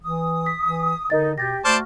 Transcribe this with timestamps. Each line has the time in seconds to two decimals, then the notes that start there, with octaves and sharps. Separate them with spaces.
0.02 E3 D#6
0.46 B6
0.64 E3
1.10 D3 D#4 A#4 D#5 A6
1.38 B2 G4 G6 A6 A#6
1.65 A3 F#4 C5 D5 A5 F6